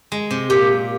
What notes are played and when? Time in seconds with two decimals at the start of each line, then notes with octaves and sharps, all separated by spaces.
0.12 G#3
0.31 C3
0.50 A#2 G4